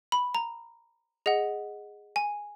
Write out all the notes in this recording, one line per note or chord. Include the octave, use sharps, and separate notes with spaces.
B5
A#5
G#4 D#5 F#5
G#5